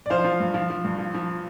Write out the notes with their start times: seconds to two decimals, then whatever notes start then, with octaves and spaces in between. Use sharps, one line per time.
0.06 D5
0.10 F3 C5 F5
0.24 F3
0.40 G2
0.54 F3
0.70 F3
0.85 G2
0.99 F3
1.14 F3